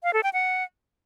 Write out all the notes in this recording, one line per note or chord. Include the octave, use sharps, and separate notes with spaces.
F5
A4
G5
F#5